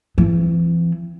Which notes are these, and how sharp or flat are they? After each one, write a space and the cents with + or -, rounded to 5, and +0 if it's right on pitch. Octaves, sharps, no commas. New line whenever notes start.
E3 +40 C4 +0